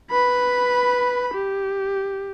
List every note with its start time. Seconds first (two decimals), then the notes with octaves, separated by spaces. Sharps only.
0.11 B4 B5
1.34 G4